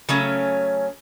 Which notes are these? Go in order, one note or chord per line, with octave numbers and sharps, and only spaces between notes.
C#3 F#3 A3 C#4